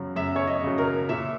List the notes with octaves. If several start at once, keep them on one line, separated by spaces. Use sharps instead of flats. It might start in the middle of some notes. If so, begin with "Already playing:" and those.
Already playing: F#2 C#3 F#3
F#2 E5
C#5
D#5
C#3 F#3
A#4
A#2 E5